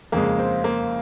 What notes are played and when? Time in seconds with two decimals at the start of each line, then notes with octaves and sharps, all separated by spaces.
0.12 F2 C#3 G#3 A#3
0.39 C4
0.64 A#3